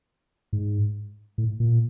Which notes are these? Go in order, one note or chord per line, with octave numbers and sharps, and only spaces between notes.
G#2
A2
A#2